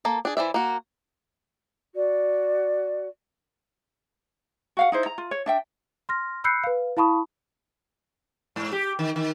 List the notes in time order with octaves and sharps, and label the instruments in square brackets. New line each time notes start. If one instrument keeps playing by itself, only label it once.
[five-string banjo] A#3 A4
D4 G#4
E3 C5 D5 E5
A#3 F#4
[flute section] F#4 D5
[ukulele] F#4 F5 F#5
D#4 E4 C5
A#5
F4
C#5
D4 E5 G5
[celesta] C6 F6 A#6
B5 E6 F#6 G6 C7 C#7
B4 F5
E4 F5 A5 B5 C#6 D#6
[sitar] G#2
G4
D#3
D#3